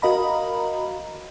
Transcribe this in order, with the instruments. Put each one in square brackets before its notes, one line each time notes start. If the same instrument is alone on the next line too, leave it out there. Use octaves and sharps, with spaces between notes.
[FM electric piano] F#4 A#4 D#5 F5 A#5 B5